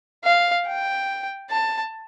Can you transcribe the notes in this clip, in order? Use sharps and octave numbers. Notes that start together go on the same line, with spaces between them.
F5
G5
A5